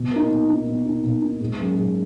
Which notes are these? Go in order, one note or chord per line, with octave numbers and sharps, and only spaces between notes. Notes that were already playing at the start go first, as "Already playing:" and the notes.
Already playing: B2
A#3 D#4
B2
A#3 D#4
B2
A#3 D#4
B2
A#3 D#4
G#2
F#3 A#3 C#4 G#4
G#2